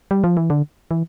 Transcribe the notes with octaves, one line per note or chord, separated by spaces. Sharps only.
G3
F3
E3
D3
E3